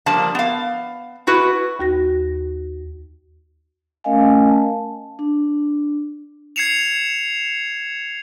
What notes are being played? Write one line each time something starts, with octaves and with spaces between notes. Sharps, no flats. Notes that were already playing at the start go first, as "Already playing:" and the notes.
F3 G3 A#3 D4 A5
B3 F5
E4 F#4 B4
D#2 F#4 A#6
A3 C#4 A#4 D#5 F5 G#5
A5
D4
G#6 C7 C#7 E7 F7